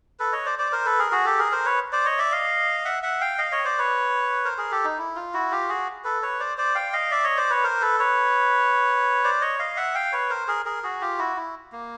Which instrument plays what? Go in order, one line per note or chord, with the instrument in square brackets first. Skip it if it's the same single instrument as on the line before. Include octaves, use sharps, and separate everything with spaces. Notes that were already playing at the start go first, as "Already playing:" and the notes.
[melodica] A4 B4
C#5 D#5
C5 D5
C5 D5
A#4 C5
A4 B4
G#4 A#4
F#4 G#4
G4 A4
G#4 A#4
A#4 C5
B4 C#5
C5 D5
C#5 D#5
D5 E5
D#5 F5
E5 F#5
E5 F#5
F5 G5
D#5 F5
C#5 D#5
C5 D5
B4 C#5
A#4 C5
G#4 A#4
G4 A4
D#4
E4
F4
E4 F#4
F4 G4
F#4 G#4
A4 B4
B4 C#5
C5 D5
C5 D5
F5 G5
D#5 F5
D5 E5
C#5 D#5
C5 D5
B4 C#5
A#4 C5
A4 B4
B4 C#5
C5 D5
C#5 D#5
D#5 F5
E5 F#5
F5 G5
B4 C#5
A#4 C5
G#4 A#4
G#4 A#4
F#4 G#4
F4 G4
E4 F#4
E4
A#3